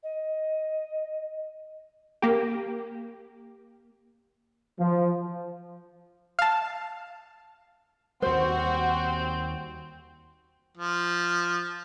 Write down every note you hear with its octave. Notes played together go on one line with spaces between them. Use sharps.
D#5
A#3 G4
F3
F5 A5
D#2 G3 C4 F#4 C5
F3